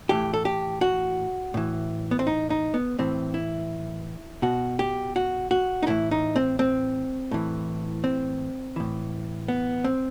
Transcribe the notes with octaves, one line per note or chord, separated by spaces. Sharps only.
A2 E3 G4
A4
G4
F#4
A2 E3
B3
C4
D#4
D#4
B3
A2 E3 C4
E4
B2 F#4
G4
F#4
F#4
D#4
A2 E3 E4
D#4
C4
C4
A2 E3
C4
A2 E3
B3
C4